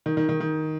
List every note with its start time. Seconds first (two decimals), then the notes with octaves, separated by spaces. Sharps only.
0.06 D#3
0.17 D#3
0.29 D#3
0.40 D#3